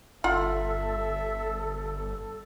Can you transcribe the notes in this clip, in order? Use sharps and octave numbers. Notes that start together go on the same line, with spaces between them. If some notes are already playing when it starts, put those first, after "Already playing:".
G1 F4 A4 E5 F#5